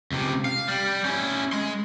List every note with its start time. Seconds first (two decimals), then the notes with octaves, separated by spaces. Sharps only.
0.12 C#2 C3
0.45 F5
0.68 G3
1.05 C#4 E4
1.53 G#3 C6